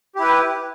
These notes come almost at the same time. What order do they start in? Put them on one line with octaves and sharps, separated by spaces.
G4 E4 B4